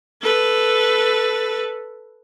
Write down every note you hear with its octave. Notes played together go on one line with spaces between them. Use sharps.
A4 B4